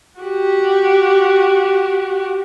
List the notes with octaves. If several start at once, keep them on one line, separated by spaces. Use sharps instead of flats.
F#4 G4